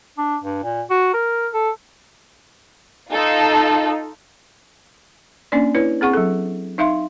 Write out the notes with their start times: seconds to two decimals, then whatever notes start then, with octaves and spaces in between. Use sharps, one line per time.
0.18 D4
0.44 G2
0.63 A#2
0.90 F#4
1.14 A#4
1.53 A4
3.14 D#4 F4 A4
5.52 A#3 C#4 D4 D5
5.75 E4 B4 C#5
6.01 C4 G#4 F#5 C#6
6.13 F#3 A4
6.78 D#4 E5 F5 C6